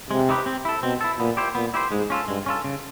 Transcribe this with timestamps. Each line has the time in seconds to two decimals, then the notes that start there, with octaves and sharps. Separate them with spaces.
0.10 C3 G#3
0.29 C4 D#4 G4 B4
0.46 C4
0.65 E4 A4
0.83 B2 C4
1.01 E4 A4
1.19 A#2 B3
1.37 E4 G4 C5
1.55 A#2 B3
1.74 E4 G4 C5
1.91 G#2 G#3
2.10 C#4 F4 A4
2.28 G2 G#3
2.46 C#4 F4 A4
2.64 C#3